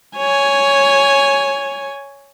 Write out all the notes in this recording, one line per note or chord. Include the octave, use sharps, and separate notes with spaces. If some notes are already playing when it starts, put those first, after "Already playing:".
C#5 G#5